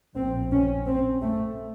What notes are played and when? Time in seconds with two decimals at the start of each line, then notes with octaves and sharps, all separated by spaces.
0.15 A#1 A2 C4
0.51 C#4
0.87 C4
1.22 A3